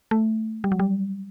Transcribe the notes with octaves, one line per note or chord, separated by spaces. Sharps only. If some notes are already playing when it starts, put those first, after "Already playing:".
A3
G3
F#3
G3